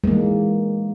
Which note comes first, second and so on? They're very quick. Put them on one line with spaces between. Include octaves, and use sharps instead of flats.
G#3 A#3 E3